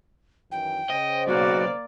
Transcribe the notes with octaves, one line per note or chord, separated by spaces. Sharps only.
F#2 D#3 E3 G5
C#3 C5 D#5
B1 A#3 F#4 D5